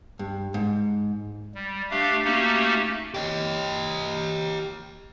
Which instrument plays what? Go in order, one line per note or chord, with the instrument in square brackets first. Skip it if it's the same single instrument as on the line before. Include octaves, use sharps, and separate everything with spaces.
[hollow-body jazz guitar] G2
G#2
[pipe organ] G3
A3 D4 G4 F5
A3 A#3 C#4 D#4 F#4 G4
[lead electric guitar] G4 D#5